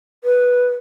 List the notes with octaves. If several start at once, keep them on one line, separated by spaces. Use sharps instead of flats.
B4